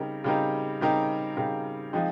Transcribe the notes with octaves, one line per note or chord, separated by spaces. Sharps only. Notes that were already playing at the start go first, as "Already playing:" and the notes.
Already playing: C#3 G3 C4 D#4 A#4
C#3 G3 C4 D#4 A#4
C#3 G3 C4 D#4 A#4
C#3 G3 C4 D#4 A#4
F3 G#3 C4 D#4